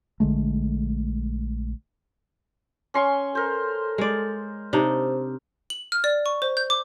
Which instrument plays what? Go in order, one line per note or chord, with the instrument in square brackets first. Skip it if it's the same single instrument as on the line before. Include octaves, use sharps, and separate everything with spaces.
[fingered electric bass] A#1 D3 G#3 A3
[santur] C#4 C6 C#6
[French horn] A4 [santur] A#4 C5
[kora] G#3 D5
[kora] C3 D4 D#4 [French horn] C5
[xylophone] F#7
F6
D5
C#6
C5
G6
D6